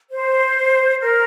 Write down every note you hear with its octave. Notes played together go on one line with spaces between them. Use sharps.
C5
A#4